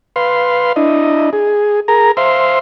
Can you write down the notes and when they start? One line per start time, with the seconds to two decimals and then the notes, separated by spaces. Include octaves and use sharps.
0.16 B4 F5 C6
0.76 D4 E4 D#5
1.33 G#4
1.88 G#4 A#4 A#5
2.17 C5 E5 F5 C6